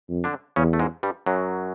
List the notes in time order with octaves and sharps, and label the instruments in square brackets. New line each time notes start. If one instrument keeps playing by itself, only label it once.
[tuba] F2
[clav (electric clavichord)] D3 D4
[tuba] E2 [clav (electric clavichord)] C#3 C#4
[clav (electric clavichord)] A3
G#2 G#3
G2 G3
F#2 F#3